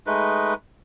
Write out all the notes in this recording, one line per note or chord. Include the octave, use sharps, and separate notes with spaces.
G#3 A3 D#4 B4